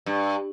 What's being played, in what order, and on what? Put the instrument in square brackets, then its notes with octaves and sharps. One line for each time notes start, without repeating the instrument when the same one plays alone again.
[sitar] G2